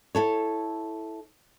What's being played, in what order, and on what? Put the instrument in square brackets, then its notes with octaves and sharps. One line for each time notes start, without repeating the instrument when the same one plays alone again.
[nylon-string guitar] E4 A4 C#5